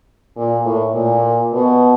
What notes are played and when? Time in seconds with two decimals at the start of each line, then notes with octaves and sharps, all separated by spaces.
0.36 A#2
0.65 A2
0.94 A#2
1.53 B2